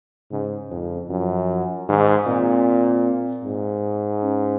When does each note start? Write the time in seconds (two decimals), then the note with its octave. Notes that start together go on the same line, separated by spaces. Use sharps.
0.31 G#2 C#3
0.71 F2
1.10 F#2 F3
1.89 G#2 D#3
2.27 A#2 C4
3.45 G#2
4.23 C#4